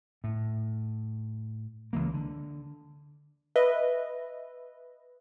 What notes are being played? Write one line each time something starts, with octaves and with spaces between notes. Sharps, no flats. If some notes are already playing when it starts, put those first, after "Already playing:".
A2
C#2 E3 A#3
D3
B4 D#5 E5